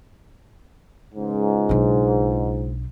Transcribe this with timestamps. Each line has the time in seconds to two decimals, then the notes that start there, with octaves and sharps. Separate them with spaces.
1.15 C#2 G#2
1.69 B1 D4